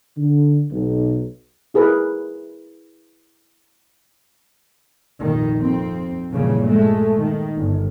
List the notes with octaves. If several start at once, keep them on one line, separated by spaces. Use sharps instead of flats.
D3
B1
E4 G#4 A#4 B4
F1 A#1 D#3
F2 C4
A#1 G2 A#2 C#3 E3
G#3 A3
D#3
G1